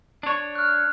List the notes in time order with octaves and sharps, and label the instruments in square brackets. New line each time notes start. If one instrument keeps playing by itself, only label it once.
[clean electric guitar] D4 C#5
[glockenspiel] F6 F#6